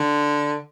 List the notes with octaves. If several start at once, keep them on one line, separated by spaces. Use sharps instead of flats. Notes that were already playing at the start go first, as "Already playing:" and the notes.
Already playing: D3